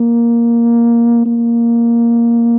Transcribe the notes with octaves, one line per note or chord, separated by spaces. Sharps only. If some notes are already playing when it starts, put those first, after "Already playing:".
Already playing: A#3
A#3